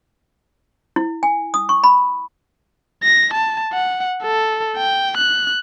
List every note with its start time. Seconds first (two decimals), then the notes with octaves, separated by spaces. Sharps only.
0.96 E4
1.23 G#5
1.54 D#6
1.69 C#6
1.84 B5
3.03 A#6
3.34 A5
3.73 F#5
4.22 A4
4.77 G5
5.18 F#6